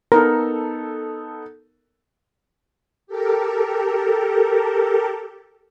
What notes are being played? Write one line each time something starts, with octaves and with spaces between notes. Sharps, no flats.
B3 D#4 A4 A#4
G4 A4 A#4